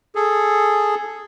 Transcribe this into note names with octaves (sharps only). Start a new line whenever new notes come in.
G#4 A4